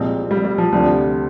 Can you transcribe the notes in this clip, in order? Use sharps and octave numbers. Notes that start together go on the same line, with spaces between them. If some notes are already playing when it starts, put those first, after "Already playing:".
Already playing: C2 A#2 F3 G#3 C4
G3
G3
F3
D2 C3 F3 G3 D4